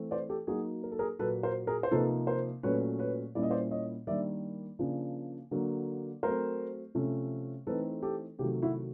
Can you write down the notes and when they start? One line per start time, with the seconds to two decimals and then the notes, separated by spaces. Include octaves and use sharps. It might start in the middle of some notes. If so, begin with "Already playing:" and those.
Already playing: E3 A3 C4
0.11 C5 D5
0.30 G4 A4
0.47 F#3 A#3 D#4 F#4 G#4
0.84 A#4
0.92 A4
0.99 G#4 A#4
1.19 A#2 F#3 A#3 A4 B4
1.43 A#4 C5
1.67 G#4 A#4
1.83 C5
1.91 C3 F3 A#3 D#4 A4 B4
2.27 A#4 C5
2.63 A#2 F#3 A3 C#4 B4 C#5
2.99 B4 C#5
3.35 A#2 G3 A#3 C#4 E4 D5
3.43 D#5
3.50 C5 D5
3.71 C#5 D#5
4.07 D#3 G3 A#3 D4 D5 E5
4.79 C#3 F3 A#3 D4
5.51 D3 F#3 A#3
6.23 F#3 A3 C4 A#4 C5
6.95 C3 F3 A3 C#4
7.67 E3 A3 C4 D#4 A4 B4
8.03 G4 A4
8.39 C3 D#3 F#3 A3 F4 G4
8.62 E4 F#4